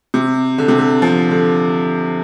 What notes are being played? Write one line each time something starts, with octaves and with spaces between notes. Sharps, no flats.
C3
D3
C3
D3
F3
D3